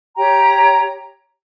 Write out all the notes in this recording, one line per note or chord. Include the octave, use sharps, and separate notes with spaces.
G4 C#5 G5 A#5